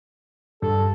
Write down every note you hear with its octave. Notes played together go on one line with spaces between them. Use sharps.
G2 A4